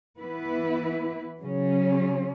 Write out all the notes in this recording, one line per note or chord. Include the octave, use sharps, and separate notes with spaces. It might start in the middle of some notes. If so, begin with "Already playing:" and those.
E3 B3 E4 B4
C#3 F#3 C#4